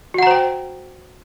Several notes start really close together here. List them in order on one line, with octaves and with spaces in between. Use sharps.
F#4 F#5 A#5 C5 G5